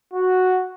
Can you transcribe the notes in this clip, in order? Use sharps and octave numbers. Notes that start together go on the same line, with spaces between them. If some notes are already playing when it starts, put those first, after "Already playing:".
F#4